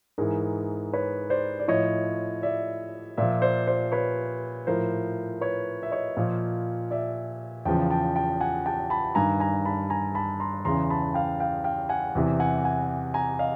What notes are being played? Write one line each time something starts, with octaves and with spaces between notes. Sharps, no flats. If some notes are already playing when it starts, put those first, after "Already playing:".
G#2 E3 G#4 A#4
B4 C#5
C5 D5
D5
A2 F3 C#5 D#5
D5 E5
A#2 F3 D5 E5
C5 D5
C5 D5
B4 C#5
A2 F3 A#4 C5
B4 C#5
E5
C#5 D#5
A#2 F3
D5 E5
E2 C#3 F3 G5 A5
G5 A5
G5 A5
F#5 G#5
G5 A5
A5 B5
G2 D#3 G#5 A#5
G#5 A#5
A5 B5
G#5 A#5
A5 B5
A#5 C6
E2 C#3 E3 A#5 C6
A5 B5
F5 G5
F5 G5
F5 G5
F#5 G#5
E2 C3 E3
F#5 G#5
F#5 G#5
G#5 A#5
D#5 F5